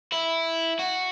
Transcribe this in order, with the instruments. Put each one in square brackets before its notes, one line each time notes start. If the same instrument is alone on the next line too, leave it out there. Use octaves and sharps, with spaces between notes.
[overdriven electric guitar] E4
F#4